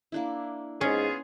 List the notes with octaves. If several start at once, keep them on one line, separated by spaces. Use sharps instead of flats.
A#3 D4 E4
G#2 B3 C#4 F4 G#4